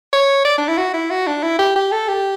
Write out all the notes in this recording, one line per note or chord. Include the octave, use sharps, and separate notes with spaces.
C#5
D5
D4
E4
F#4
E4
F#4
D4
E4
G4
G4
A4
G4